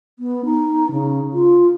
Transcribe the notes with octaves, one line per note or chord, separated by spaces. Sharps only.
B3
D#4
C#3
F4